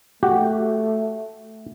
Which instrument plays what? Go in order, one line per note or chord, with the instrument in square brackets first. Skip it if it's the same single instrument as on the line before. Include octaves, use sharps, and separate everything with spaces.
[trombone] A3 [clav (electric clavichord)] F#4 G4